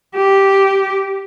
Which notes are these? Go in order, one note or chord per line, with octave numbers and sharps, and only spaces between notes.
G4